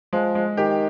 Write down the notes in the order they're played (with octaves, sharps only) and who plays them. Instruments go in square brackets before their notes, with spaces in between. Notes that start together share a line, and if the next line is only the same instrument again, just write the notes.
[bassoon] F3 [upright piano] G#3
[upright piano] G#3
[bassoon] D#3 [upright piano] G4